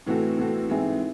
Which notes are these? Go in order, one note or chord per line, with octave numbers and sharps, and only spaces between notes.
A2 E3 C4 F#4 A4
A2 E3 C4 F#4 A4
G#2 E3 C4 E4 G#4